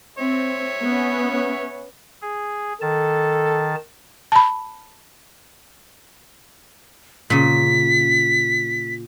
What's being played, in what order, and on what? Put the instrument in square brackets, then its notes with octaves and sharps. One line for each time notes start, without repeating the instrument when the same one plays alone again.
[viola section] C4 [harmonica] C#5 E5
[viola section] B3 C#4
[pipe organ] G#4
[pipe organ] D#3 A5 [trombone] A4
[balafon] A5 B5
[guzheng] A#2 C#3 [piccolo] B6